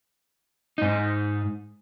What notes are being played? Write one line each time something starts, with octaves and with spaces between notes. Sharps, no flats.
G#2 D#4